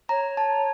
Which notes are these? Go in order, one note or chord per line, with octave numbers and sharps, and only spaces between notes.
C#5 A#5
A5